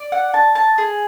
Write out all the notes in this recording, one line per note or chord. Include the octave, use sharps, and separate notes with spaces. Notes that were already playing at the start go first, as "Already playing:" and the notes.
Already playing: D5
F#5
A5
A5
G#4